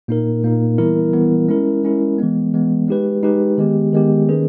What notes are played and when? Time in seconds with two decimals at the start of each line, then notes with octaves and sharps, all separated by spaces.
0.08 A#2 A#3 D#4 A#4
0.43 A#2 A#3 D#4 A#4
0.78 E3 G3 B3 E4 A#4
1.13 E3 G3 B3 E4 A#4
1.48 G#3 C#4 E4 A#4
1.83 G#3 C#4 E4 A#4
2.19 E3 G#3 B3
2.54 E3 G#3 B3
2.88 G#3 D#4 G4 B4
3.23 G#3 D#4 G4 B4
3.58 D#3 G#3 B3 G4
3.93 D#3 G#3 B3 G4
4.28 D#3 A#3 C#4 G#4 B4